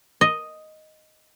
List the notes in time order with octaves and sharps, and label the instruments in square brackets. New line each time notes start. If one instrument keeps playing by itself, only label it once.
[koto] D#5